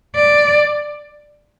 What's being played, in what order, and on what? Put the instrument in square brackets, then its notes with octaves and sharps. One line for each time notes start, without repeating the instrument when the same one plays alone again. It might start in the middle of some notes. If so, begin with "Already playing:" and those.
[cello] D5